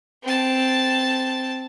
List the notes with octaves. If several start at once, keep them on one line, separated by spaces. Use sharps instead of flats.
C4 A5